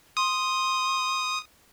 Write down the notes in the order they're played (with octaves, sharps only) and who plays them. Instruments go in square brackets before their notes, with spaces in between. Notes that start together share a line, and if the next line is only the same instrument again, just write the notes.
[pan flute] C6 [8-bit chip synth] D#6